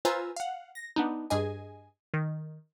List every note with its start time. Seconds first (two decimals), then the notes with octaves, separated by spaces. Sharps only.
0.05 F4 B4 C5 G#5 A#5 E6
0.36 F5 F#5
0.75 A#6
0.96 B3 D4 D#4
1.30 G2 G#4 D#5 G#5
2.14 D#3